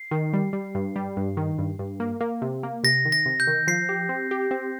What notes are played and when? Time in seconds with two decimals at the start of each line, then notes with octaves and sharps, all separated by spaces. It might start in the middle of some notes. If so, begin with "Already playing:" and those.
Already playing: C7
0.11 D#3
0.33 G3
0.53 G3
0.75 G2
0.96 G3
1.17 G2
1.37 D#3
1.58 G2
1.79 G2
2.00 A#3
2.21 A#3
2.42 C3
2.63 A#3
2.84 C3 A#6
3.05 D#3
3.12 A#6
3.26 C3
3.40 G6
3.47 D#3
3.67 F3 C7
3.89 G4
4.09 C4
4.31 G4
4.51 C4